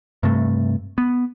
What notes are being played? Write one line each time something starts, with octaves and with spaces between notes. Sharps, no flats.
G2 C3 A3
B3